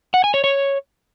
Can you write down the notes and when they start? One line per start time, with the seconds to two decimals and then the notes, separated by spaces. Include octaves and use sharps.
0.14 F#5
0.24 G#5
0.34 C#5
0.44 C#5